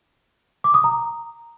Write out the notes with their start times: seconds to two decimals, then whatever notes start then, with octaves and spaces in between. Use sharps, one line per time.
0.64 D6
0.74 D#6
0.84 A#5